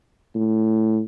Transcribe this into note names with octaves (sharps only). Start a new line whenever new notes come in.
A2